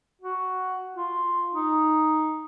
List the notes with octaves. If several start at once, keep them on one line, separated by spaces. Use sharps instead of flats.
F#4
F4
D#4